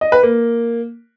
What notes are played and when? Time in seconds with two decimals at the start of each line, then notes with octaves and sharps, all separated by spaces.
0.01 D#5
0.12 B4
0.23 A#3